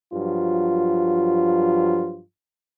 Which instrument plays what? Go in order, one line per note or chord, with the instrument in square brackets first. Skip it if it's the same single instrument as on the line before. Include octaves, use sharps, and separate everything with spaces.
[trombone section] G2 F3 F#3 F4